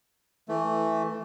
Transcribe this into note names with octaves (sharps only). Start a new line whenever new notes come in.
E3 A3